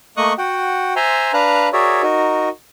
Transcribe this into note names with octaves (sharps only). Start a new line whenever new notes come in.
A3 A#3 D#5 C#6 D#6 F#6
F#4 F#5 G5
C5 E5 G#5 A#5 C6
D4 B4 F5 A#5 F#6
F#4 G#4 A#4 C#5 D5 E5
D#4 F#4 A#4